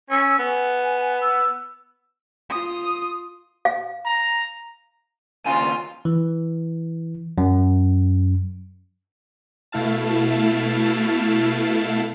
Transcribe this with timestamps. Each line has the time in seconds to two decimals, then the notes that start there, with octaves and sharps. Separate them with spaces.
0.10 C#4 E6
0.39 B3 G#5
1.21 E6
2.50 F4 D#6
3.65 F5
4.05 A#5
5.46 D#2 C#3 F4 G#5
6.05 E3
7.38 F#2
9.72 B2 A3 E4 F5 A5